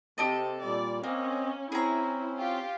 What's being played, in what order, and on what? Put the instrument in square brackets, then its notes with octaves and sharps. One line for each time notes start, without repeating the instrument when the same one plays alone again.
[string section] C3 [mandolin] G4 A4 D#5
[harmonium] A#2 G3 [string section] D5
[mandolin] A#3 [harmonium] C4 D#5 [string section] C#4
[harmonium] C4 C#4 [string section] E4 [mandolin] G#4 A#5
[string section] F4 G4